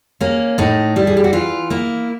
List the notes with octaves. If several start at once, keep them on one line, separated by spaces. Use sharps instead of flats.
A#3 C#4
A2 D#4
G3 E4
G#4
G4
F#4
E3 F4
A#3 E4